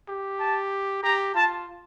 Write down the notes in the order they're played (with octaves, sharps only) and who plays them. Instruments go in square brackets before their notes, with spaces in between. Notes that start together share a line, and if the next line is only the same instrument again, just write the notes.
[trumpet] G4
[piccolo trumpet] A5
[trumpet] G4 [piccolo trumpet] A#5
[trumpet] F4 [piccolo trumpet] A5